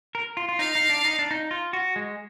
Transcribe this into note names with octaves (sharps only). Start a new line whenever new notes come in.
A#4
F4
F4
D#4 F5
D#4
D4
D#4
D4
D#4
F4
F#4
G#3